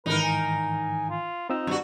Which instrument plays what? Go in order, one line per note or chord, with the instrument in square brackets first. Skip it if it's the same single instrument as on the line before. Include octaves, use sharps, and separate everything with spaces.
[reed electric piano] G#2 D#3 E3 [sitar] D#4 A#4 [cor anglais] B4
[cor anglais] G#5
F4
[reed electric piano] C4 F4 E6 [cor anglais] D#4
[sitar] G2 F#4